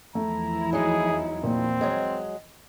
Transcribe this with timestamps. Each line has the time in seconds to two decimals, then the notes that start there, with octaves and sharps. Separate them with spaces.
0.15 E2 F3 A3 E4 A#5
0.73 F#3 G#3 D#4 G#4
1.43 A#2 C4
1.81 F#3 G#3 D#5